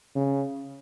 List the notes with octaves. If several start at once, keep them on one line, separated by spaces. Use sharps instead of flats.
C#3